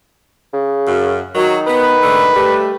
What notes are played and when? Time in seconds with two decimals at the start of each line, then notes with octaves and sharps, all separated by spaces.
0.53 C#3
0.88 F#2
1.35 D#3 F#3
1.67 B3 B4
2.03 G#2 D3 A3
2.36 G3 A3